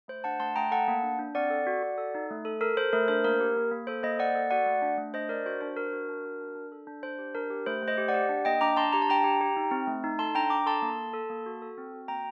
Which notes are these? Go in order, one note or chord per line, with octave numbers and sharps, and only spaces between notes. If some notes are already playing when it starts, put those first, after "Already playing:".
A3 C5
D4 F#5 A5
A3 A5 C6
A3 G5 A#5
A4 F#5 A5
A#3
D4
D4
C4 D5 F#5
A4
F#4
F#4
A4
D#4
A3
A4
A4 A#4
A4 C5
A3 A#4
D4 C5
A#3 A#4
G4
A#3
A#3
A4 C5
A#3 C5 D#5
A#3 D5 F#5
A4
F#4 D5 F#5
A3
D4
A3
D4 C5 D#5
D4 A#4 D5
F#4 C5
D4 C5
D4 A#4
F#4
D4
F#4
D4
D4
A4
D4
D4 C5
G4
D4 A#4
G4
A3 C5
A3
C5 D#5
G4
D5 F#5
G4
D4
A#3 D#5 G5
D4 A#5 D6
D4 A5 C6
G4 A#5
A5
D4 G5 A#5
G4
G4
D#4
C4
A3
D#4
A4 A5 C6
D4 G5 A#5
D4 A#5 D6
A4 A5 C6
A#3
A4
A4
A#3
F#4
A4
C4
F#4
A#3 G5 A#5